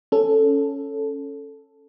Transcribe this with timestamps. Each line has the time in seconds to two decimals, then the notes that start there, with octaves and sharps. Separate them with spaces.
0.12 C#4 A4